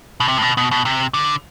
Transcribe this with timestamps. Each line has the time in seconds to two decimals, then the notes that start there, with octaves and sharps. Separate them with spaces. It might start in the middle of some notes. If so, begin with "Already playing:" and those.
0.20 B2
0.28 C3
0.38 A2
0.42 B2
0.57 B2
0.71 B2
0.85 C3
1.14 D3